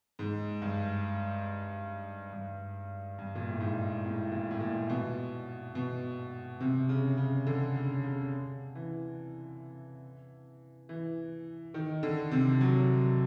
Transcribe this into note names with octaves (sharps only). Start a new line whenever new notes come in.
G#2
G2
G2
G2
A#2
A2
G#2
A2
A#2
A2
A#2
B2
B2
C3
C#3
C#3
D3
C#3
C#3
E3
E3
D#3
D3
C3
F#3